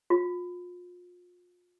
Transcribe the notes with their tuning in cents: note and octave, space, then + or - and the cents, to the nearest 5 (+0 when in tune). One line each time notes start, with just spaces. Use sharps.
F4 +30